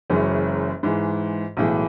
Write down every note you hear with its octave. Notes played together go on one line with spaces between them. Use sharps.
F#1 F#2 E3 G#3 C#4
G#2 E3 G#3
B1 A2 E3 G#3